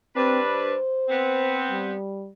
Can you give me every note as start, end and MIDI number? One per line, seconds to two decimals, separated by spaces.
0.16 0.74 43
0.16 0.39 60
0.16 0.74 62
0.16 0.74 71
0.47 1.63 72
1.09 1.92 59
1.09 1.92 60
1.71 2.30 55